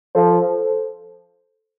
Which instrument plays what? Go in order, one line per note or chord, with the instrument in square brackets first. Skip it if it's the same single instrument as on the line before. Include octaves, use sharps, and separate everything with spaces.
[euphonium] F3 [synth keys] A4 C5